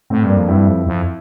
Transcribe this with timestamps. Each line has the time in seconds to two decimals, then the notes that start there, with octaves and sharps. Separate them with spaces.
0.10 A2 A3 C4
0.24 G2
0.29 A#3 D4
0.36 F2
0.48 G2 C4 E4
0.68 F2
0.86 F2